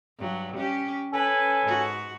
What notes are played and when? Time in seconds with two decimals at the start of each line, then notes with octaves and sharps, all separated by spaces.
0.18 G2 F#3
0.57 C#4 G4
1.13 C#4 A4 B4 G#5
1.63 G#2 F#4